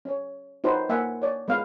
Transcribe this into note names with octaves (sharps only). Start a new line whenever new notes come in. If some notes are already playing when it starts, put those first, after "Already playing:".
C#4 C#5
D#4 F#4 B4 C5 A5
A#3 E5 F#5 G#5
C#5 D5
G#3 B3 B4 F5